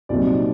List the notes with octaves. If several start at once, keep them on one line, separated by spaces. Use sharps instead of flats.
C2 A#2 F#3 C4 D#4 D5